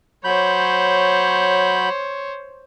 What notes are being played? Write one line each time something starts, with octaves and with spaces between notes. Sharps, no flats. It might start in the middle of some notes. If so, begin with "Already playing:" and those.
F#3 C5 C#5 B5 G6